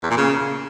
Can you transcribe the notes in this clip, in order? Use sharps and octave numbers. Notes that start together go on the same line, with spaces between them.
E2
A#2
C#3